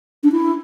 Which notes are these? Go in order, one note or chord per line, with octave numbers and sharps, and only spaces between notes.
D4
E4